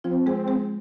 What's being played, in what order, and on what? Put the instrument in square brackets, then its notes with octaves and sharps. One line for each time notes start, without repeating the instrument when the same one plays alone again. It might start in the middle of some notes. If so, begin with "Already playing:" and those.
[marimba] F3 F4 [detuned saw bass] C4
[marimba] G#3 G#4
G#3 G#4